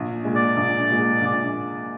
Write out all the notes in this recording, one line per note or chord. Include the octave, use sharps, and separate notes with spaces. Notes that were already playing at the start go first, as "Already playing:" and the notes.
Already playing: A#1
A#2 G#3
D5
A#1
A#2 G#3
A#1